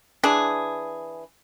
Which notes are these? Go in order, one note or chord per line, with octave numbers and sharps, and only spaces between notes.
E3 D4 G#4